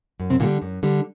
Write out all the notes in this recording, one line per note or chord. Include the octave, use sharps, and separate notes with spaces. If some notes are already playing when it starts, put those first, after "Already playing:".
F#2
C3 C4
A#2 D3 G3 A#3
F#2
D3 G3